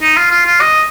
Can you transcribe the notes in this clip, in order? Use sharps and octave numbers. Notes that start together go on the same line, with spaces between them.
D#4
F4
F4
F4
D#5